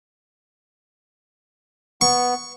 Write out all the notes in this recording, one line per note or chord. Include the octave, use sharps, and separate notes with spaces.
B3 C#6